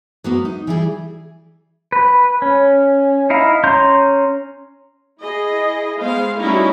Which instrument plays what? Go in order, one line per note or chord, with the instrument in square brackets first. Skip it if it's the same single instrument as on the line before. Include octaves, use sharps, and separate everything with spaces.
[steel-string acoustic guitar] F#3 A#3 B3
D#4
E3 G3 G#4
[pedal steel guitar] B4
C#4
D#4 E4 F5
C#4 A#5 C6 G6
[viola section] E4 G#4 D#5
G#3 B3 C5 F5
G3 A3 C#4 D#4 E4 F#4